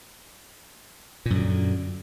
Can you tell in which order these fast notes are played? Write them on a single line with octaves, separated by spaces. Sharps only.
A#2 F#2 D3